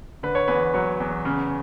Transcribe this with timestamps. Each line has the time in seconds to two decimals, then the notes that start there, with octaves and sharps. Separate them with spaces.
0.23 D3 B4
0.35 C#5
0.48 E2 B4
0.74 F#3 C#5
1.00 E2
1.25 C#3